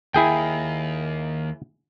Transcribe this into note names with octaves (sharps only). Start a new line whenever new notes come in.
D#2 E4 G#4 G5